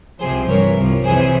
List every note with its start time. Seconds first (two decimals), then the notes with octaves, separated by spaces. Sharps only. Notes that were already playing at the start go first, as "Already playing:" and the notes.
0.20 C2 C3 F3 G#4 C5
0.48 G2 E3 A#4 C#5
0.77 C2 C3 F3
1.04 F2 C3 E3 G#4 C5